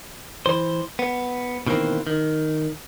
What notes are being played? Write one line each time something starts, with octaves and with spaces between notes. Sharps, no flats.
E3 C5
B3
B2 D#3 E3 A#3 C4
D#3